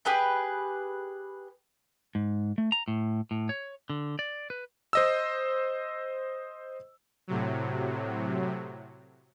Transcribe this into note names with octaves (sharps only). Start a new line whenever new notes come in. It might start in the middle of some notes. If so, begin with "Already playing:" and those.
G4 G#4 B4 G5
G#2
A3
A#5
A2
A2
C#5
D3
D5
B4
C5 D#5 E6
A2 C3 F#3